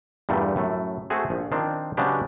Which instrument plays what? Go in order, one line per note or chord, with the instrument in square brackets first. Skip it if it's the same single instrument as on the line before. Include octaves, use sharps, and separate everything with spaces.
[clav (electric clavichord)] E2 G2 A#2 G3 A3
F#2 A2 A3
A3 C4 F#4 G#4
A#1 F3
D#3 F3 C4 D4
C#3 F#3 G#3 B3 D4 G4